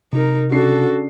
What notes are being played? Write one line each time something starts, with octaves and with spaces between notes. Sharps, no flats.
C3 D#4 A#4
C#3 D4 F#4 A4 C7